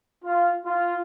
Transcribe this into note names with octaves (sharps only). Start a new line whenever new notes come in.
F4
F4